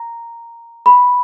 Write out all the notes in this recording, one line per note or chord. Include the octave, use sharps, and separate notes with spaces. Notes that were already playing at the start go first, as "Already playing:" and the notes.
Already playing: A#5
B5